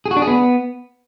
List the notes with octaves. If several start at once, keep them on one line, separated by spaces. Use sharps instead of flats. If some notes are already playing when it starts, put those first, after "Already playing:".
G#4
F#4
D4
G#4
B3